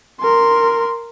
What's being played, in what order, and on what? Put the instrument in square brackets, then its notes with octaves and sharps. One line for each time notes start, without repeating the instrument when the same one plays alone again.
[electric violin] A#4 C6